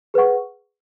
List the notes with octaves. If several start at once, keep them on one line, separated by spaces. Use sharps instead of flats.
G#4 B4 F#5 C#6